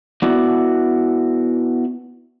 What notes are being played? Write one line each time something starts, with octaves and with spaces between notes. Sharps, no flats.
B3 E4 F#4 D5